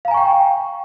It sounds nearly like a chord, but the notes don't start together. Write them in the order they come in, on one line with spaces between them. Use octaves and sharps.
F5 A#5 G#5 C#6 G5